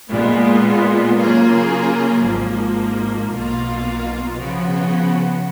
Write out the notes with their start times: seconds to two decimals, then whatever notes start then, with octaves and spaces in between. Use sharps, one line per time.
0.11 A#2 G#3 B3 F4
1.18 C#3 F#3 A#3 F4 G#4
2.24 G#1 G#2 F3 A#3
3.30 B1 B2 A#3 F4
4.37 C#3 F3 B3 F#4